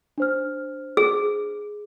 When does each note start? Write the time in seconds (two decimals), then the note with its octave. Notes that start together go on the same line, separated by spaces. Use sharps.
0.18 D4 C5 F6
0.97 G#4